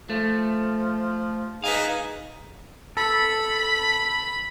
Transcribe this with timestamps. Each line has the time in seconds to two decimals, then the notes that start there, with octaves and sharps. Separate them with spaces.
0.10 F3 A3
1.64 D#4 G#4 B4 D#5 F5
2.97 A4 B5